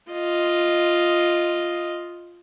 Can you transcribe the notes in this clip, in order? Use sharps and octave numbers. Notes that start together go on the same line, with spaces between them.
F4 D#5